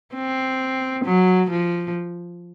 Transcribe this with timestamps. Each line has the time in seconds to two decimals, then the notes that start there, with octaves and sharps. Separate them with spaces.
0.14 C4
1.04 F#3
1.50 F3